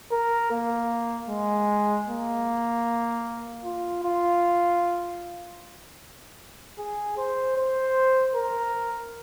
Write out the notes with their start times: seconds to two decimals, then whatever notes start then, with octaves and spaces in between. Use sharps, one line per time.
0.11 A#4
0.51 A#3
1.29 G#3
2.07 A#3
3.64 F4
4.04 F4
6.78 G#4
7.17 C5
7.57 C5
8.35 A#4